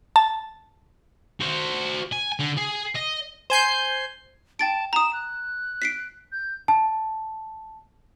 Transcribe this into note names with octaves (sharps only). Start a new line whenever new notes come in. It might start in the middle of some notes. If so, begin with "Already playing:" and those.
A5
F#4 C5
G#5
D3
G#4
D#5
C5 G#5 G6 C7
G5 A5 A6 D7
A#5 D#6 E7
F#6
B6 C7 D7
G6
A5